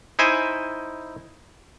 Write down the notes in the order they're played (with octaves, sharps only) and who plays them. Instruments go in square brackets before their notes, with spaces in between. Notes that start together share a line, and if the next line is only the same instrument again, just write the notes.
[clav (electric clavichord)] D#4 E4 C5 G#5